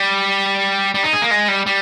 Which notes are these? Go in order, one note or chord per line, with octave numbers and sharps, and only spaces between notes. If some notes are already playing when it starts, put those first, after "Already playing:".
Already playing: G3
G3
D#4
G#4
A#3
G#3
G3
G3